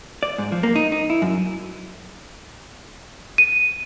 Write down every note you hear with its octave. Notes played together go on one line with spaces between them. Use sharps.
D5
G#2
F3
A#3
D#4
D#4
E4
F#2
D#7